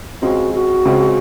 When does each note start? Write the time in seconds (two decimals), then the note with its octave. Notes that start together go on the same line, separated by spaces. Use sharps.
0.22 C#2 C#3 G#3 C4 F#4
0.54 F#4
0.85 C#2 C#3 G#3 C4